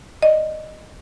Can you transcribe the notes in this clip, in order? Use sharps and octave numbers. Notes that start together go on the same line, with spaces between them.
D5 D#5